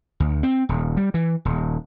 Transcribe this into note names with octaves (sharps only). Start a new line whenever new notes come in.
D2
C4
D#1
G3
E3
D#1